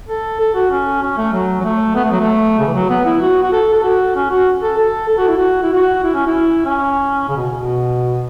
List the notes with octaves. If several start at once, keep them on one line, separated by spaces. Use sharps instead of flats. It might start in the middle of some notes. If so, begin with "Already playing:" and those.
A4
A4
F#4
C#4
C#4
A3
F#3
F#3
A3
B3
A3
F#3
A3
C#3
E3
F#3
B3
E4
F#4
F#4
A4
A4
F#4
C#4
F#4
A4
A4
A4
F#4
E4
F#4
E4
F#4
E4
C#4
E4
C#4
C#3
B2
B2